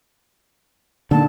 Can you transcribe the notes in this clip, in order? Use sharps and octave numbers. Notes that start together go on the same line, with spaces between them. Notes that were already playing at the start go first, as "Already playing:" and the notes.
A#1 D3 D#3 A5